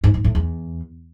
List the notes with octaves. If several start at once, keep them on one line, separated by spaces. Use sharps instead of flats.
G#2
G#2
A2
E2